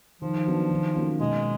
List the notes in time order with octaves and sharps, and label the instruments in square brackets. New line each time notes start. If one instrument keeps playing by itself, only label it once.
[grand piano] D#3 [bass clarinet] F3
[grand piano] F#3 B3 D4
D#3
F#3 A#3 C#4 F4
[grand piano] B2 [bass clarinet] G#3